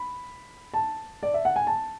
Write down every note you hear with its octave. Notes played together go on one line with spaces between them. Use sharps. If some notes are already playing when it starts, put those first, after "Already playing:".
Already playing: B5
A5
D5
E5
F#5
G#5
A5